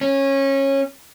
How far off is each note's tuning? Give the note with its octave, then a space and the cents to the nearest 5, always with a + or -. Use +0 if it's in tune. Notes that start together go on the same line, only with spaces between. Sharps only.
C#4 -20